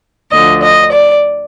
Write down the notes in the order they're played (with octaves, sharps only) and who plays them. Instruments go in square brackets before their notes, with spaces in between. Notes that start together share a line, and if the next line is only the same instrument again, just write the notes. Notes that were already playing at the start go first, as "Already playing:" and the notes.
[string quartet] D2 D3 F3 D#5
D#5
D5